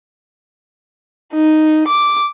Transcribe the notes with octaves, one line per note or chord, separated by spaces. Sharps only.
D#4
D6